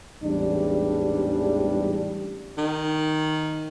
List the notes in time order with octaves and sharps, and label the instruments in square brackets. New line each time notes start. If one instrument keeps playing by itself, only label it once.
[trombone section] A1 E2 G#2 G3 D4
[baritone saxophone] D#3